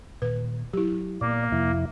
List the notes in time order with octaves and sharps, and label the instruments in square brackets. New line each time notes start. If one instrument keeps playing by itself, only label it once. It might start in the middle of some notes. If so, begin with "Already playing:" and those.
[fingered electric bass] A#2 D#3 [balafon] B4
[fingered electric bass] F#3 [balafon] E4 G4
[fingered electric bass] A#2 B3 [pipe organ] A#3 [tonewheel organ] D5
[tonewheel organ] F2 E4 [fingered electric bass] C3